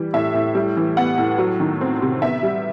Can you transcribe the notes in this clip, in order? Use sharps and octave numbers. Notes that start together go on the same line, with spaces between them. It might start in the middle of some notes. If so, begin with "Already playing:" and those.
Already playing: E3 G3
A2 E5
A2
G3
E3
B3 F#5
A2
F#3
D#3
C4
C3
B3 E5
G3